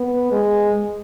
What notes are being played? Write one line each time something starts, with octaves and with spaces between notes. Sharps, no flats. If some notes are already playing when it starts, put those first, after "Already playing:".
Already playing: B3
G#3